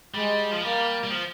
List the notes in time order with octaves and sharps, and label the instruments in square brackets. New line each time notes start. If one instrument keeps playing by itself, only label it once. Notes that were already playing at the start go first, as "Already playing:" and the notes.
[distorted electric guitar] G3 [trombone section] G#3
[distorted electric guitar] F3
[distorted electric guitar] G3 [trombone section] A#3
[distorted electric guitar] G3
F3